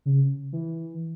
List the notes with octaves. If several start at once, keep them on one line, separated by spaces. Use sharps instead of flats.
C#3
E3